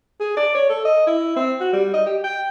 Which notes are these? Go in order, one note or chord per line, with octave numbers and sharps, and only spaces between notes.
G#4
D5
C#5
A4
D#5
E4
C4
F#4
G3
D#5
G4
G5